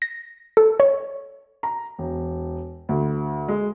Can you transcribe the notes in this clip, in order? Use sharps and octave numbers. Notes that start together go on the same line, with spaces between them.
A#6
A4
C#5
A#5
E1
D2
G#3